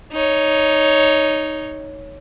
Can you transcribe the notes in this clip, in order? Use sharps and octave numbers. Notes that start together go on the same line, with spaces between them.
D#4 C#5